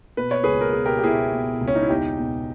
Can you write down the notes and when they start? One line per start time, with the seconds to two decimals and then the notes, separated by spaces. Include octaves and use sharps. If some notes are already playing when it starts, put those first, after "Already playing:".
0.17 B2 B4
0.31 C#5
0.44 C#2 G#4 B4
0.61 A#4
0.73 B2 G#4
0.85 G4 A#4
0.99 G4
1.04 B2 E4 G#4
1.32 B2
1.61 C#2
1.68 C#4
1.75 D#4
1.82 E4
1.89 E2 D#4 G4
2.19 B2